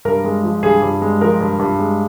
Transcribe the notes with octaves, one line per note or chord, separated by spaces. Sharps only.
G2 A#4
G#3
F3
G2 G#4
G2
G#3
F3 A#4
G2
G2
G#3